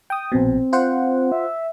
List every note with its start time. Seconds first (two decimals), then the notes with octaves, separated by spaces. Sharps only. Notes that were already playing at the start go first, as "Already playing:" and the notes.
0.10 G5 D#6
0.32 A#1 B2 C4
0.73 F4 C5 F#5
1.32 E5